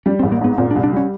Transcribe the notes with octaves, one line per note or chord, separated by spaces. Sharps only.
G3 C#4
A1 C4
A#3
G#2 B3
A#2 C4
D4
C2
D4
G3 C#4